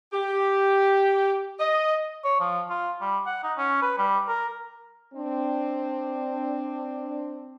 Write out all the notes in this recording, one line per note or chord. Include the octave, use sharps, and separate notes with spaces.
G4
D#5
C#5
F3
F4
G3
F#5
D#4
C#4
B4
G3
A#4
C4 D4